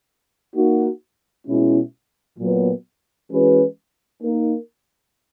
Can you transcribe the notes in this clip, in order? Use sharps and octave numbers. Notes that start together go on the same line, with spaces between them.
A#3 D#4 F#4
B2 G#3 C#4 E4
A#2 F#3 B3
E3 G#3 C#4 F#4 B4
A#3 D#4 A#4